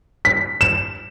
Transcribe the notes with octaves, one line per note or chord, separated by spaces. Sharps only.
B6
E7